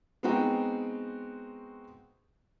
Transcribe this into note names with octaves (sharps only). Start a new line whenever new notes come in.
G#3 B3 C4 D#4 F#4 G5